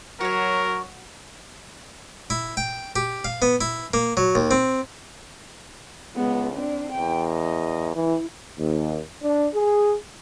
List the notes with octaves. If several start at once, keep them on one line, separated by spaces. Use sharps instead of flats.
F#3 F#4 A#4 C#5
E4
G5
G4
F5
B3
E4
A#3
F#3
D#2
C4
C#2 G#3 B3
C4 D4
E2 G5
D#5
E3 E4
D#2
D4
G#4